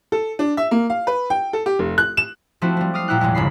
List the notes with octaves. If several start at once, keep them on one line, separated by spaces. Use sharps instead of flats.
A4
D4
E5
A#3
F5
B4
G5
A4
G4
F1
F#6
E7
F3 A3 C4 E4 F#4
G3 C4
D6 D#6 F6 C7
A#2 A#3 E4 F#5 G5 F#6
F1 A#1 E2 G#3 E4
G1 C#3 B5 C7